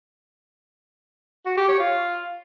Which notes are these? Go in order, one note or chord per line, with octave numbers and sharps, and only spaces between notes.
F#4
G4
C#5
F4